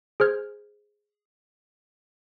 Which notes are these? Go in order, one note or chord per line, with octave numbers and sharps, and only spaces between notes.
G#4 C5 F6 G#6